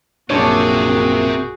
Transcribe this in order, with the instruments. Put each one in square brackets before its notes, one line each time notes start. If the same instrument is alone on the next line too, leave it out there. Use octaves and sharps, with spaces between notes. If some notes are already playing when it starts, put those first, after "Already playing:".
[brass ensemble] A#1 F#2 A#3 [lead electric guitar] C3 [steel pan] D4 C#5 [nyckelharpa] F#4 G#4